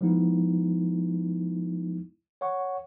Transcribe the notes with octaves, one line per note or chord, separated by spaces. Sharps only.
F3 G#3 B3 D#4 E4
C#5 F#5 C#6